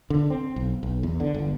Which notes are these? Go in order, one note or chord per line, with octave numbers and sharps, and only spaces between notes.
D3
C4
B1
B1
E2
D3
G1